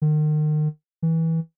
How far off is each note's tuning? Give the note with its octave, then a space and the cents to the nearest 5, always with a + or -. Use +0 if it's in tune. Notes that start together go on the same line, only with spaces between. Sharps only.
D#3 -35
E3 -20